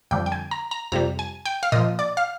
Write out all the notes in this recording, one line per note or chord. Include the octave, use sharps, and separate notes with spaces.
F2 D3 G3 G5
G5
G#5
A#5
A#5
F2 C3 G3 A#5
G#5
G5
F5
A#2 F3 D#5
D5
F5